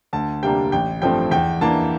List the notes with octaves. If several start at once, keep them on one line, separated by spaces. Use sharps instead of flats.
D2 A5
C3 G3 A#3 D4 G5
A1 G5
G2 F3 A3 C4 G5
E2 G5
E3 A#3 D4 A5